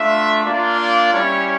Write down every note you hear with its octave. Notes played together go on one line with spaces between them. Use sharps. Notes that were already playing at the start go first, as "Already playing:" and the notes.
Already playing: A3 D4 F4 E5
A#3 D4 F4 D5
D5
G3 C#4 E4 C#5